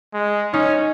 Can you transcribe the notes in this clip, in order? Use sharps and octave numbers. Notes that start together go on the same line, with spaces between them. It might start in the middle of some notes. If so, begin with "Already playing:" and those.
G#3
C#4 D#4